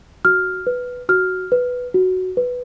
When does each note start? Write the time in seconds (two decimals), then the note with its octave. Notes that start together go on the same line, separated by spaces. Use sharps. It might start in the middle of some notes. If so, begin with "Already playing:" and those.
0.25 F#4 F6
0.67 B4
1.09 F#4 F6
1.52 B4
1.94 F#4
2.37 B4